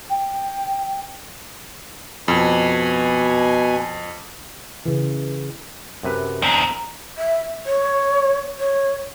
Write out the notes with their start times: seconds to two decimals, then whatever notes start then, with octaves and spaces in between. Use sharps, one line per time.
0.10 G5
2.28 F2 B2 G#5
4.86 C#3 E3
6.03 F#2 C3 B4
6.42 E2 C4 D4 A#5
7.18 E5
7.66 C#5
8.59 C#5